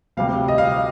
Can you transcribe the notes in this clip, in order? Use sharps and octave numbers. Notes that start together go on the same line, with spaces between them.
D2 C3 G3 F5
D#5
F5